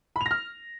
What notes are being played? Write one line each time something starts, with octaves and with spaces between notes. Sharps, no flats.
B5
F7
A#6
F6